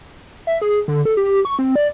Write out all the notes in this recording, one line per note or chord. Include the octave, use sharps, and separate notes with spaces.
E5
G#4
D3
A4
G4
C#6
C4
D5